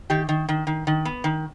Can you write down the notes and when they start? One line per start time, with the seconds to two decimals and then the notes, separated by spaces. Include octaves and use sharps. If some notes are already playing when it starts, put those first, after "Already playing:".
0.10 D#3 G4
0.29 D#3
0.49 D#3
0.67 D#3
0.87 D#3
1.05 B3
1.24 D#3